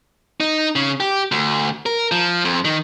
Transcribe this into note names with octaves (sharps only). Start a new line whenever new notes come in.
D#4
C#3
G4
D2
A#4
F3
F2
D#3